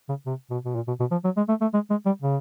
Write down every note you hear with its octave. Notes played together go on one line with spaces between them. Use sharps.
C#3
C3
B2
B2
A#2
B2
B2
F3
F#3
G#3
A3
A3
G#3
G#3
G3
C#3